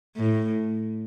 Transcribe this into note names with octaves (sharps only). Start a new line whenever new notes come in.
A2